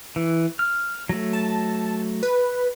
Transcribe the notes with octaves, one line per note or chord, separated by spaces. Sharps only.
E3
F6
F#3 A3
A5
B4